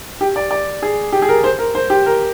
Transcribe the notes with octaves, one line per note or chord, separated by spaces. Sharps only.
G4
D5
D5
G#4
G4
G#4
A#4
C5
A#4
C5
G4
A#4